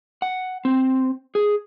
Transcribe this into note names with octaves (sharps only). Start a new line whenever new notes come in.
F#5
C4
G#4